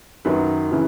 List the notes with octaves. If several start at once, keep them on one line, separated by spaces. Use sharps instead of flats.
F#2 D#3 F#3 B4
C#3 E3